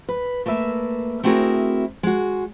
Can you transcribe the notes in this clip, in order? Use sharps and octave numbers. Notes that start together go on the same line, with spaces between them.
B4
A3 A#3 B4 E5
A3 C4 E4 F#4 G#4 A#4
G#3 F#4